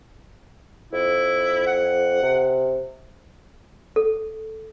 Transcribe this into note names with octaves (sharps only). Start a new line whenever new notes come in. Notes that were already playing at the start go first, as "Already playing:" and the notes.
F2 E4
F#5
C3
A4